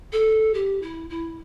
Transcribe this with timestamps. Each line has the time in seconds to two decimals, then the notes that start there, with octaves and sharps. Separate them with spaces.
0.12 A4
0.54 G4
0.82 E4
1.09 E4